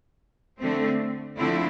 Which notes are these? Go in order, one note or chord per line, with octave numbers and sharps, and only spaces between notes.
D3 A3 C4
D3 F3 A3 C4 E4